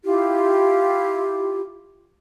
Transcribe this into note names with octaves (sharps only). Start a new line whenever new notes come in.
E4 F4 G4